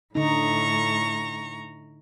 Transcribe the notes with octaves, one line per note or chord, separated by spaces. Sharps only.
A2 D3 D#4 A#5 C#6